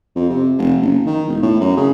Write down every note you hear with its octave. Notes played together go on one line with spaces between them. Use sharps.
F2
C3
F1
F#1
D#3
E1
A2
F#2
C#3